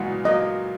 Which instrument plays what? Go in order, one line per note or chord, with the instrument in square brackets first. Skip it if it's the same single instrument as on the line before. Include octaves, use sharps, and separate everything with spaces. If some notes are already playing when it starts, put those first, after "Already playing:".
Already playing: [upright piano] A#2 C#3 E3 F#3 G#3 [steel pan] F#5
[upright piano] F#3 A#3 [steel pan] D#5